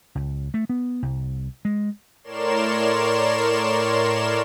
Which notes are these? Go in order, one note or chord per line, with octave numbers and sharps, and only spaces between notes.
C#2
A3
B3
C2
G#3
A2 A#4 C#5 D5 C6 E7